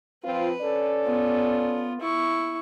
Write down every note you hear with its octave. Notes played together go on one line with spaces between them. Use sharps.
F3 C4 F4 B4
C#4 A4 D5
B3 F4
E4 C#6